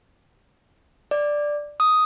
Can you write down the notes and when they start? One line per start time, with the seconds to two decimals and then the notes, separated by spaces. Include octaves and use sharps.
1.11 D5
1.80 D#6